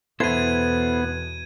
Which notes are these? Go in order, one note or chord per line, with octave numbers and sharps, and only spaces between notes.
E2 B2 B3 E4 A4 C5 G#6 D#7